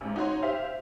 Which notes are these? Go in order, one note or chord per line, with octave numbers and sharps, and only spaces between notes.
A1 G#2
D#4 F#4 C#5 C6
G4 C5 E5 F5